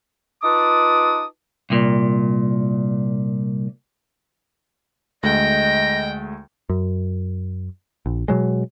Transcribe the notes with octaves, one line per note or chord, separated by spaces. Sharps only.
D#4 F4 B4 A5 D6 D#6
C2 A#2
D2 G#3 A3 D#5 G5 A#6
F#2
A#1
B2 F#3 G#3